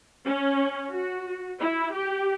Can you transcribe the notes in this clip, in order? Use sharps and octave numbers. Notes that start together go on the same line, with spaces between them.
C#4
F#4
E4
G4